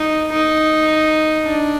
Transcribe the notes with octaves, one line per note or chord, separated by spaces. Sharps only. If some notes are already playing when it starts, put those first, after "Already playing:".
Already playing: D#4
D#4
D4